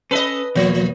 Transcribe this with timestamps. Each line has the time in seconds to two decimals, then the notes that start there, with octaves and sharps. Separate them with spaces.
0.11 C#4 A4 B4 D#5
0.55 B1 E2 F3 A#3